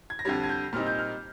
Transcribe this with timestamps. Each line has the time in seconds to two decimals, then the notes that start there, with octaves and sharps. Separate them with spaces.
0.10 G#6
0.19 A#6
0.25 F2 D3 G3 G#6
0.44 G#6
0.49 G6
0.73 A#2 G3 C4 D#4 F6
0.86 G6
0.99 F6